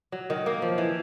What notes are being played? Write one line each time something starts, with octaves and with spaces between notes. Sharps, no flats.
F#3
D#3
A#3
F3
E3